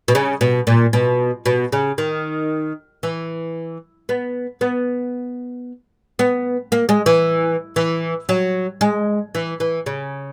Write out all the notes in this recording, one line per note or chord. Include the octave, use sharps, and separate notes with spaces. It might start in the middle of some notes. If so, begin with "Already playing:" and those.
B2
C#3
B2
A#2
B2
B2
C#3
D#3
E3
B3
B3
B3
A#3
G#3
E3
E3
F#3
G#3
E3
E3
C#3